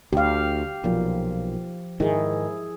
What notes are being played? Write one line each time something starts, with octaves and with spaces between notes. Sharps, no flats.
D2 G4 F5
B1 A#2 F3
G#2 D#3 E4 G#4